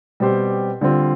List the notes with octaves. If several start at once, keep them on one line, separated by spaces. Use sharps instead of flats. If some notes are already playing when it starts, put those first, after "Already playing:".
B2 G3 C4 G4 C5
D3 G3 C4 F4